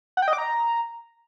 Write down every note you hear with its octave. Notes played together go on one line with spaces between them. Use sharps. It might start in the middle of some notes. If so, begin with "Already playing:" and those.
F#5
G5
D#5
D6
A#5